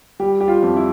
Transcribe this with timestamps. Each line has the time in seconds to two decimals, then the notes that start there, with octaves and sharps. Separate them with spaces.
0.20 G3 G4
0.41 G4
0.48 F4
0.62 F2
0.76 E4